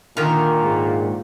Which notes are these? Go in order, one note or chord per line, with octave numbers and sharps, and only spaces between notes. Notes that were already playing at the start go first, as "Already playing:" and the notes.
A#2 D3 D#3 A#4
G#2